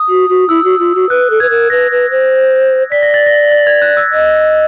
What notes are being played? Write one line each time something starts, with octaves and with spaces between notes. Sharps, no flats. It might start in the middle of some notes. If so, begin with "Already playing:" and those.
Already playing: D#6
F#4
F#4
E4 E6
F#4
F4
F#4
B4 F#6
A4
B4 G#6
A#4
B4 A#6
B4
C5
D5 B6
A#6
A6
A#6
A6
G#6
F#6
E6
D#5